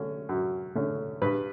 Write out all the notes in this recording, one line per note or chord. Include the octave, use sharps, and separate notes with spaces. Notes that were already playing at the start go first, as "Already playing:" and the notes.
Already playing: D3 A3 C#4
F#2
D3 A3 C#4
G2 B4